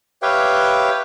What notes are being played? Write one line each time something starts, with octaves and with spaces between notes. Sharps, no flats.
G4 B4 C#5 E5 F5 G5